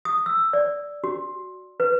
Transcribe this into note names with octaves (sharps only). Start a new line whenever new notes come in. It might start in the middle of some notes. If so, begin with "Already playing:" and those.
D#6
E6
D5
F#4
B4